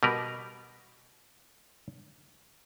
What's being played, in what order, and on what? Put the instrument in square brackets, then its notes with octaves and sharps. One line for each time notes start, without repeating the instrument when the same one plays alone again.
[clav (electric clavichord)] B2 G3 A#4 B4